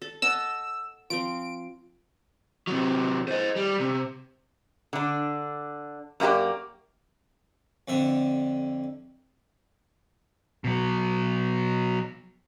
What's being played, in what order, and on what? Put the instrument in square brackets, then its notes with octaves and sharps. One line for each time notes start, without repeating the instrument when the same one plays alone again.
[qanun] A4
[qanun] D#5 F#5 A5 [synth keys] E6
[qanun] F3 C4 [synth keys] D7
[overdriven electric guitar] C3 F#3
C5 D#5
G3
C3
[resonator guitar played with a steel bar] D3 D4
F#2 A#3 C4 G4 D5
[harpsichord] F2 D3 E5
[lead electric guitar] B2 F#3